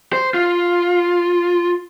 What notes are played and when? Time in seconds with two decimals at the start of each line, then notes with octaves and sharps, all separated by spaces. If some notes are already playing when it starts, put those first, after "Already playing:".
0.13 C5
0.34 F4